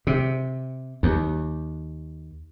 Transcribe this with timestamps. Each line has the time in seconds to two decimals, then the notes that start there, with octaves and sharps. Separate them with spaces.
0.07 C3
1.03 D#2